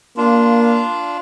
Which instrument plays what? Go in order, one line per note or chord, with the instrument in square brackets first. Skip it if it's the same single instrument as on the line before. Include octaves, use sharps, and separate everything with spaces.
[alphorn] A#3 [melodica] D4 F4